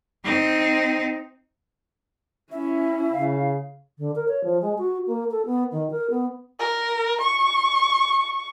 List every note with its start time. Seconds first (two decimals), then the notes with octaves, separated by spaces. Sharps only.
0.24 C4 D#4
2.52 C#4 E4 E5
3.13 C#3 F5
3.98 D3
4.15 A#4
4.28 C#5
4.43 F3
4.61 G#3
4.78 F#4
5.06 A#3
5.31 A4
5.45 B3
5.71 D#3
5.91 A#4
6.10 B3
6.60 A#4
7.21 C#6